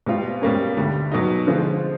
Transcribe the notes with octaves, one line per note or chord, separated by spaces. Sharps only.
B2 G3 C4 F4
B2 G3 A#3 C#4
D2 D3 G3
B2 F#3 B3 D#4
D3 F3 G#3 C4 F4